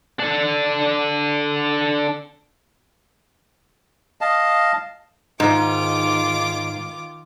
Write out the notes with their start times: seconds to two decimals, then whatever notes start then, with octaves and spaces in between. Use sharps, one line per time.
0.20 D4 A4
4.21 D#5 F5 A5
5.40 G#2 D#3 F4 D6